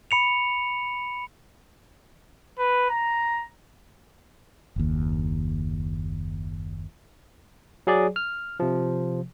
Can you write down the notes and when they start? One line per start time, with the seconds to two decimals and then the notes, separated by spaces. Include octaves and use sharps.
0.11 B5 C#7 F7
2.59 B4
2.90 A#5
4.76 F#1 D#2
7.87 F#3 G#4 D5
8.16 F6
8.60 C3 F3